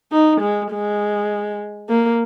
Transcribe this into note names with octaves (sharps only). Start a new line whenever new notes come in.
D#4
G#3
G#3
A#3